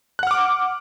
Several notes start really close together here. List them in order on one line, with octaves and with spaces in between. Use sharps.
F#6 F#5 F6 D6